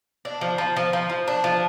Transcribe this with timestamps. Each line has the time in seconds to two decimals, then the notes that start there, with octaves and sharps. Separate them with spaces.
0.25 D4
0.41 F3
0.58 F3
0.76 F3
0.93 F3
1.10 F3
1.28 D4
1.44 F3